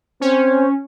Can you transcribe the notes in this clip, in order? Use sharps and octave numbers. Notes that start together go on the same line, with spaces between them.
C4 C#4 C5